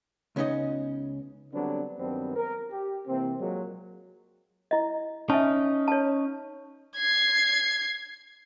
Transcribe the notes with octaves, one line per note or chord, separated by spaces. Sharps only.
C#2 C#3 B3 C#4 D#4 D#5
D3 F#3 G3 B3 C4 D4
G2 D#3 F#3 B3 C4 D4
A#4
G4
C3 E3 A#3 C4
A#2 F#3 G#3
E4 D#5
C#4 D#4 E5 G#5 A5
C#5 A5
G#6 C7